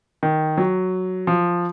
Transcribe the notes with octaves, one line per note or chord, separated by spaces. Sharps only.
D#3
F#3
F3